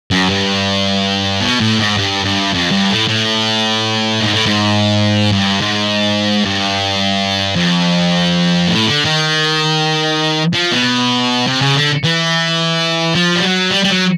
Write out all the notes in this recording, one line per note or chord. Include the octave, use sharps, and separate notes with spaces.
F#2
G2
B2
A2
G#2
G2
G2
F2
G2
A2
A2
G#2
A2
G#2
G2
G#2
G2
F2
A2
D3
D#3
F3
B2
C3
C#3
D3
E3
F3
G3
F#3
G3
G3
F#3